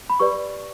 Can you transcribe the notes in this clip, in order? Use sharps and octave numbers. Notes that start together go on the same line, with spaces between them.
B5
G4 B4 D5 C#6